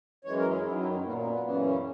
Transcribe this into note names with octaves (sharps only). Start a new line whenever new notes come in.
F#2 E3 G#3 C#5
A#4
G#4
F#2 D#3 F#3 E4
D#4
C#4
A#2 A#3 B3
A#3
B3
F#2 C#3 E3 B3
C#4